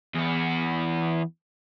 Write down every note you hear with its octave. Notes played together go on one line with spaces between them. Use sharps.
E2 B3